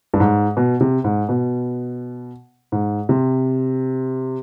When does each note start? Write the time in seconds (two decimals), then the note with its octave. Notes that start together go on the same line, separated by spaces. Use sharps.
0.14 G2
0.20 G#2
0.57 B2
0.81 C3
1.04 G#2
1.29 B2
2.72 G#2
3.09 C3